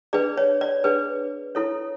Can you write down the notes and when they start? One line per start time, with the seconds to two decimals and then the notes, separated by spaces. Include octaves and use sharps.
0.13 D4 G#4 B4 D5
0.38 C#5
0.61 D5
0.84 D4 G#4 B4
1.55 E4 A4 C#5